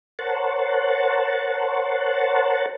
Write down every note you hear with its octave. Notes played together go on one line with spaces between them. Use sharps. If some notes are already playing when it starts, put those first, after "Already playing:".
A#4 C5 C#5 F#5 A5